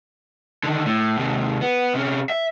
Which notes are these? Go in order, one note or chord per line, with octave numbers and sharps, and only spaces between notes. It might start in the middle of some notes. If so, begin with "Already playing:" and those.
D3 D#3
A2
D#2 C3
B3
C3 C#4
E5